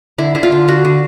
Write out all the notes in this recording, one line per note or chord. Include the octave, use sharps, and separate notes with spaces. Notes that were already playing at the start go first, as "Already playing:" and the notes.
D3 E4
D3 E4
F4
D3
D3 F#4
D3